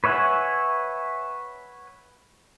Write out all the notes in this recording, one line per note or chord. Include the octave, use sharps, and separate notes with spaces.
B4 C#5 E5 F#5 G#5